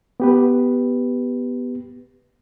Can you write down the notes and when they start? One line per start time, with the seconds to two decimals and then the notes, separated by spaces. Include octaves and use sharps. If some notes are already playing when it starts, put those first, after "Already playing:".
0.20 B3 G4 B4